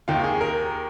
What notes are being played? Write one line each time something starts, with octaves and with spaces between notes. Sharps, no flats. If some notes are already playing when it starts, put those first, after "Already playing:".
D#2 D#3 F4
G#4
A#4